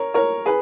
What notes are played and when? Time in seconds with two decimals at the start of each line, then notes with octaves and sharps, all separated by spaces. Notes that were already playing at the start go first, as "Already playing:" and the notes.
Already playing: A#4 C#5
0.14 A#4 C#5
0.46 G#4 B4